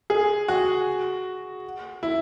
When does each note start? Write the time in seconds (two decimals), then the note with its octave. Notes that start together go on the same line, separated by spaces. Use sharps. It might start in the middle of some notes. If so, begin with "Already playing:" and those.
0.10 G#4
0.48 F#4
2.03 E4